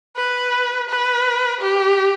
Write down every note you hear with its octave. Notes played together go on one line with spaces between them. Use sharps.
B4
B4
G4